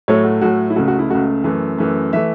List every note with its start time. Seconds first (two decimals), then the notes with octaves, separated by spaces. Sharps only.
0.08 A2 F#3 A3 C#5
0.25 F#4
0.41 A2 F#3 A3 F#4
0.70 E4
0.76 C#2 C#3 A3 F#4
0.88 F#4
0.99 E4
1.10 C#2 C#3 A3 F#4
1.44 F#2 E3 A3
1.78 F#2 E3 A3
2.13 E3 A3 E5